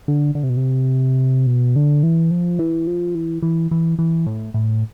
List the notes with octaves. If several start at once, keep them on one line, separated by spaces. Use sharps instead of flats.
D3
D3
C3
B2
C3
B2
D3
E3
F3
E3
F3
E3
E3
E3
E3
A2
A2